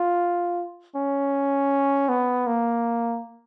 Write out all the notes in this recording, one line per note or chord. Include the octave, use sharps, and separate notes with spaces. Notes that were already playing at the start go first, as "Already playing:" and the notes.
Already playing: F4
C#4
B3
A#3